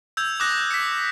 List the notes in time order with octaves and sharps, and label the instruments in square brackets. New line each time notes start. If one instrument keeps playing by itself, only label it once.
[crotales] E6 G6 G#6 F7
D6 D#6 F#6 A#6
B6 C#7